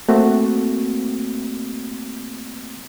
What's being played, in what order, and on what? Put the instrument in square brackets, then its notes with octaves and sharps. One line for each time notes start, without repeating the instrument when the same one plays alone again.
[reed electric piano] A3 A#3 C4 F#4